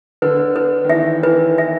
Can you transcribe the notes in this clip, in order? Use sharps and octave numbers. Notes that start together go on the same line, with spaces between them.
D3 B4
B4
D#3
E3 E5
E3 B4
E5